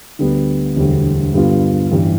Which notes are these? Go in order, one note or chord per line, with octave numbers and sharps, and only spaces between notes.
D2 D3 G3 B3
E1 D2 D3 G3
G2 D3 G3 B3 F4
A1 G2 E3 G3